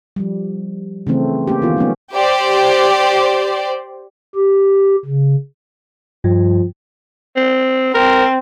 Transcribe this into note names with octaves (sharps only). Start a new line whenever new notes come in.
F3 G3
C#3 E3 A3 C4
A#3 C#4 G4
D#3 E3 B3 F4
F#3 A3 B3 C#4
G4 C5 D5
G4
C#3
G2 F3
C4
C4 A#4